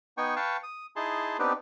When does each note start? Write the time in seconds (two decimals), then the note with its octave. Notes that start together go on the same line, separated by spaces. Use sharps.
0.18 B3 D#4 G5 G#5 C#6
0.36 B4 F5 G5 A5 C#6
0.63 D#6
0.96 D#4 E4 G#4 A5 C6
1.39 B3 C4 D4 D#4 G4 B4